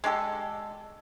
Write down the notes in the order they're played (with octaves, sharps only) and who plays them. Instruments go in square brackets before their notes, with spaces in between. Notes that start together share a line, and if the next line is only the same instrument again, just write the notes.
[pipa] G#3 D4 G4 A4